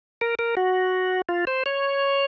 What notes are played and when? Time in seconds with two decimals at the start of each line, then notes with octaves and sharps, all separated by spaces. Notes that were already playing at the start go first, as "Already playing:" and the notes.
0.21 A#4
0.39 A#4
0.57 F#4
1.29 F4
1.47 C5
1.66 C#5